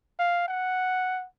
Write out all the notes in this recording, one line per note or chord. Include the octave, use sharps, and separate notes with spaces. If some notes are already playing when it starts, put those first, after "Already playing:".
F5
F#5